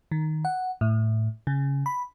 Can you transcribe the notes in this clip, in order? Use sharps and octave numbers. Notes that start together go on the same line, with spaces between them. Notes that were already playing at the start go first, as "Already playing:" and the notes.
D#3
F#5
A2
C#3
B5